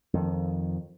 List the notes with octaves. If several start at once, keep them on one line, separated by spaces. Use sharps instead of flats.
F2 D#3